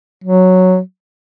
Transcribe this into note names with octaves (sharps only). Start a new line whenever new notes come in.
F#3